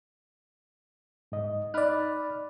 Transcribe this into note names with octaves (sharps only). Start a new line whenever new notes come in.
G#2 D#5
D#4 D5 B5 F6 F#6